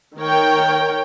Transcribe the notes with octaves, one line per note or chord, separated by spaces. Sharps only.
D#3 A#4 C#5 G5